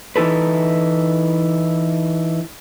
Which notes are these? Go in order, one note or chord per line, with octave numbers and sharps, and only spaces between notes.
E3 D#4 E4 A4 B4